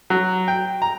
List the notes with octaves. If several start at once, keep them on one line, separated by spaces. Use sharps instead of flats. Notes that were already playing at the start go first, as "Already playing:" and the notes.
F#3
G5
A#5